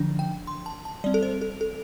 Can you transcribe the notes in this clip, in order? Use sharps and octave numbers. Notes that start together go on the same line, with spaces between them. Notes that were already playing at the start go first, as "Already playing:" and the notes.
Already playing: D3 F3 D4
G5
C6
A5
A5
G3 C4 D5
A4
C5
A4
A4